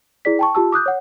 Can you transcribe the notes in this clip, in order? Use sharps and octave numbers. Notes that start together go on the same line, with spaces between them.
E4 G#4 D5 B6
G5 A5 C#6
F4 G4 A5 E6
D6 D#6 F#6 G6
C#5 F#5